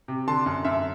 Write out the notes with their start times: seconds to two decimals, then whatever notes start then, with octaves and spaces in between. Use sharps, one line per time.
0.08 C3
0.27 D3 A5 C6
0.46 F#2
0.65 F#2 E5